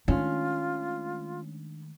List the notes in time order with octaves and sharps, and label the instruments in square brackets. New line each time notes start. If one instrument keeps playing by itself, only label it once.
[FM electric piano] D#3 G#3 A3 [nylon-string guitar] C#4 [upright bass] D4 [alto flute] F4